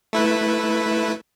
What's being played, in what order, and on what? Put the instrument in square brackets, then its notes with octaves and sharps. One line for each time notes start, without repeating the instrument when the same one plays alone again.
[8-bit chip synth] A3 E4 B4